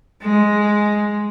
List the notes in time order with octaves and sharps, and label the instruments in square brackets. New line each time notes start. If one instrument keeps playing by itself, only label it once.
[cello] G#3